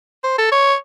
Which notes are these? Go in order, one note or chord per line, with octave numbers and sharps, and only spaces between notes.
C5
A4
C#5